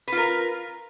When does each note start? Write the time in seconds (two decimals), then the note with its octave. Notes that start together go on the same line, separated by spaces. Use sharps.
0.08 B4
0.12 F4
0.17 A#4